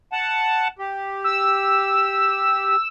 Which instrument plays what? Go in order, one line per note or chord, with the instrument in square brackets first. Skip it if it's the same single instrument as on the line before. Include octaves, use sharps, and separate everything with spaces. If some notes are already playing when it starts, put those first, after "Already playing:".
[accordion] F#5 A5
G4
[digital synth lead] E6